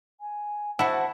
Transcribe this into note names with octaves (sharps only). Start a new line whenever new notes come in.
G#5
E4 F#4 C5 F#5 A5